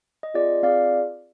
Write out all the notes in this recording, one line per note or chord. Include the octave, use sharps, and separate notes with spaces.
D#5
C4 F4 G#4 D5
C4 F4 G#4 D5 F5